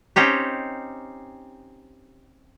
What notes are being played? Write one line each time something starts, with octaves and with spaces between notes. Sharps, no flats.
C4 C#4 D#4 G4